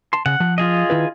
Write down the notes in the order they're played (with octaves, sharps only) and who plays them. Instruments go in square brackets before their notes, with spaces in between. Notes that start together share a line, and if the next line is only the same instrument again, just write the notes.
[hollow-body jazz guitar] A5 C6
[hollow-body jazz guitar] C#3 [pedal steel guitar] F#5
[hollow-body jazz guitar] F3
[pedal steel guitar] F4 G#4 D#5
[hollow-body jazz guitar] D#3 E4 B4